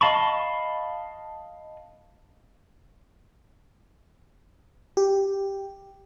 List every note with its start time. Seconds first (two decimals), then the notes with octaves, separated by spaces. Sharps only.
0.01 D#5 F5 A5 B5 C#6
4.97 G4